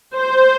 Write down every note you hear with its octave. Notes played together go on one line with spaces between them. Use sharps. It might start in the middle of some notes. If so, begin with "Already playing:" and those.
C5